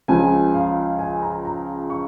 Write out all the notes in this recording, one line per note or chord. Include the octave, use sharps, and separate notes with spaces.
C#2 C#3 F3 G#5
F5
G#5
A#5
A#5
C#6